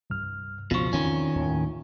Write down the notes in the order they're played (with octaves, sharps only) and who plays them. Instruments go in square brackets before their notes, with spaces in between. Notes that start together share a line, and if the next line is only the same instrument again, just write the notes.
[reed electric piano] C2 G2 F6
[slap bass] C#2 [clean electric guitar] B2 F3 [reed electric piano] F4 C#6
[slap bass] E2 E3 C4 [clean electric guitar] D#3 C#4
[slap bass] D#2 A2